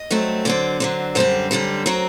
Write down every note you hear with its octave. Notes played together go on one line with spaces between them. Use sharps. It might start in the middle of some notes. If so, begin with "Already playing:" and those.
Already playing: D#5
G2 F#3 A3 C4
D3 F#3 C4 D5
D3 F#3 C4
F#2 D3 G3 C4 C5
F#2 D3 G3 C4
F#3 C4 A#4